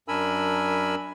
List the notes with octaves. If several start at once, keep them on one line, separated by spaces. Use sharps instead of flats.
F#2 D4 A#4 G#5 B5 E6